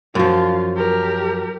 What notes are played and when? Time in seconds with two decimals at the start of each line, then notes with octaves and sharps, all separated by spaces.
0.15 F#2 F3 F4
0.77 G4 A#4